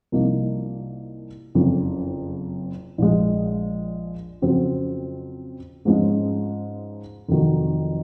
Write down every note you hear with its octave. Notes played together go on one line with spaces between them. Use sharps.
C2 C3 F3 A#3 D#4
F#1 F2 C#3 F3
A#1 A#2 F3 G#3
F2 C#3 F#3 C4
G#2 F3 G#3 C#4
F1 F2 D#3 F#3